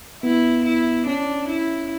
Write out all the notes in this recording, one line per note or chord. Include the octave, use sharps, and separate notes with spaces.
B3 E4
E4
C#4 D4
E4